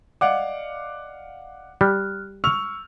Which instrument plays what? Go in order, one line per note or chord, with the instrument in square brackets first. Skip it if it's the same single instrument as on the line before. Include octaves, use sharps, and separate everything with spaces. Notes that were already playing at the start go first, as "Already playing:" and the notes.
[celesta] D5 D#5 [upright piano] F5 F#5 D6
[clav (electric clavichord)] G3 [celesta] F6 F#6
[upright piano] C#6 F6 F7 [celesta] E6